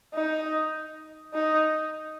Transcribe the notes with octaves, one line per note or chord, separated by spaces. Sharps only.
D#4
D#4